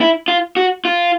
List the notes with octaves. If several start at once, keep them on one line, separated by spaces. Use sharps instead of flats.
E4
F4
F#4
F4